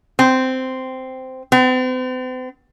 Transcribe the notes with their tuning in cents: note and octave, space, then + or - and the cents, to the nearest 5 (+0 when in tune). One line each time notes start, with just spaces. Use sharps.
C4 -10
C4 -45